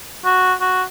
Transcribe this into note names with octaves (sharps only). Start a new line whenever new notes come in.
F#4
F#4